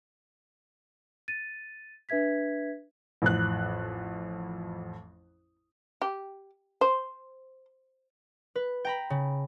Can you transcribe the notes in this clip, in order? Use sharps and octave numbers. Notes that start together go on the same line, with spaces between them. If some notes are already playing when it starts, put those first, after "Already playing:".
A6 D#7
D4 B4 E5 G#6 B6
A1 F2 F#6
G4
C5
B4
G5 A#5 B5
C#3